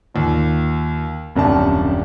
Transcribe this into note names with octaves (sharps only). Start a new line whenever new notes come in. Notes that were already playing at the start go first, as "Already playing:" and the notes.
D#2 A#2
D#1 F#2 C3 D4 G4 A5